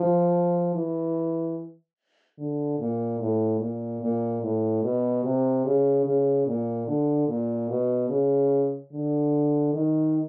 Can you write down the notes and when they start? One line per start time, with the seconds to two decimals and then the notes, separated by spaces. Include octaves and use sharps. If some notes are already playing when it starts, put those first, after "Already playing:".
Already playing: F3
0.74 E3
2.38 D3
2.79 A#2
3.20 A2
3.60 A#2
4.01 A#2
4.42 A2
4.83 B2
5.24 C3
5.65 C#3
6.06 C#3
6.47 A#2
6.87 D3
7.28 A#2
7.69 B2
8.10 C#3
8.92 D3
9.73 D#3